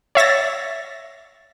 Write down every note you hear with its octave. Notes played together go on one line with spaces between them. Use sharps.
C#5 E5 A6 A#6